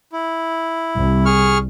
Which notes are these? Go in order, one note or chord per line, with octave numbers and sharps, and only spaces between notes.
E4
C2
G#4 C#6 F6